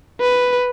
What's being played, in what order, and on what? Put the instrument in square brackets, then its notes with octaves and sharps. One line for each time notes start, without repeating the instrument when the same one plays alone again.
[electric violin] B4